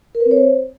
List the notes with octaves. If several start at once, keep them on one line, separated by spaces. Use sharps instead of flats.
A#4
B4
C4
C#5
C5